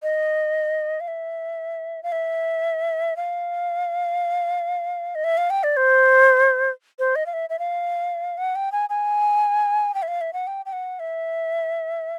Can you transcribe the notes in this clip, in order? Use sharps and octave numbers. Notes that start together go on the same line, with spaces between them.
D#5
F5
E5
F5
E5
F5
D#5
E5
F5
G5
D5
C5
C5
D#5
F5
E5
E5
F5
F#5
G5
G#5
G#5
G5
E5
F5
E5
F#5
G5
G5
F#5
E5